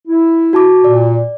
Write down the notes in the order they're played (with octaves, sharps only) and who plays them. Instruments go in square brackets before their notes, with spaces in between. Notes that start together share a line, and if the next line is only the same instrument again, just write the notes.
[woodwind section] E4
[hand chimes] F#4 A5 D6
[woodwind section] A#2 [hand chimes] D5